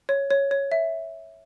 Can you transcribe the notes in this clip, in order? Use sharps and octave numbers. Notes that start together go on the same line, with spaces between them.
C#5
C#5
C#5
E5